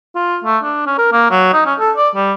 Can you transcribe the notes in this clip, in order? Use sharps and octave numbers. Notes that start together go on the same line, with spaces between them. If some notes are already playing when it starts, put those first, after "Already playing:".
F4
A3
D4
C#4
A#4
A#3
F#3
D#4
C#4
A4
D5
G3